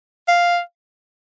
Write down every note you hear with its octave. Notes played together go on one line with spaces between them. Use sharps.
F5